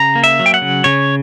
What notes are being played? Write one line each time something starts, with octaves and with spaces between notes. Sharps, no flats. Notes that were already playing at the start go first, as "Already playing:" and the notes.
Already playing: C#3 A#5
A#3
E5
F#3
G5
F#5
C#3
C#3 C#5